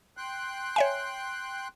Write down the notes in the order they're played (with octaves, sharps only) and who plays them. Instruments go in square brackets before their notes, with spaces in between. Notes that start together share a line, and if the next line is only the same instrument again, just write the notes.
[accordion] G5 C6 F#6
[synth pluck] C#5 E5 G#5